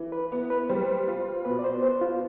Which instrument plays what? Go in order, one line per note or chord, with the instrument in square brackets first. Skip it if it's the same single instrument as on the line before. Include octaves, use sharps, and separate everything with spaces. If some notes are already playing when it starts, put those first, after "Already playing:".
Already playing: [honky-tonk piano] E3
[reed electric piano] B4
[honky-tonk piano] B3
[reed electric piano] B4
[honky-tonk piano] G3 [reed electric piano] C5
[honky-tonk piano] F4
[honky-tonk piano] B2 [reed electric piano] B4
[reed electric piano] D5
C5
[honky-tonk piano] B3 [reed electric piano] C5
[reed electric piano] F4